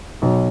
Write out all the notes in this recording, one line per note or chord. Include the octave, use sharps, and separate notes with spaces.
B1